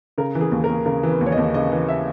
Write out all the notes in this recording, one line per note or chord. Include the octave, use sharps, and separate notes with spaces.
C#3 A#4
E3
G#4
D#2
A#4
D#2
C#3 A#4
E3
B4
D#2
C#5
D#5
D#2
C#3 D#5
E3
E5